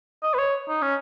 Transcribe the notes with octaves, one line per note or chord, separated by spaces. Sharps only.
D#5
B4
C#5
D#4
C#4